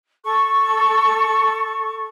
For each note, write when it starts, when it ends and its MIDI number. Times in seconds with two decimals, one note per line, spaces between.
0.24 2.05 69
0.24 2.05 85